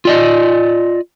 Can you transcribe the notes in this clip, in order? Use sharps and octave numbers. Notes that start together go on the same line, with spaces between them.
F4 D5 D#5